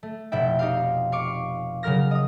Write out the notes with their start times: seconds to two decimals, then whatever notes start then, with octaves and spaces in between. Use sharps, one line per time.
0.03 A3
0.32 F1 B2 E4 E5 G5
0.59 D#4 G4 F5
1.12 F5 C#6 D6
1.83 C#3 F#3 A#4 F6 A#6
2.11 D#5 D#6